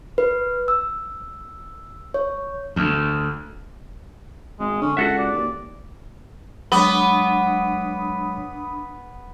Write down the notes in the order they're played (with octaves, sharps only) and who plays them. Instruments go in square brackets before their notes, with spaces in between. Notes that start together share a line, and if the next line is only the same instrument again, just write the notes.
[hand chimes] B4
E6
C#5
[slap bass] D2
[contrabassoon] G#1 [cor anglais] G#3
[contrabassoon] D3 [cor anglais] C#4
[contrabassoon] C#2 [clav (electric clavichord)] F#4 A4 E5 [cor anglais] F#5
[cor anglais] D5
[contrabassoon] D#2
[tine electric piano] F#3 G#3 C#5 [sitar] B3 [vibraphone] D4 [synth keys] B5 D#6